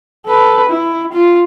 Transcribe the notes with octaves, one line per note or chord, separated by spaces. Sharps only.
A4 B4
E4
F4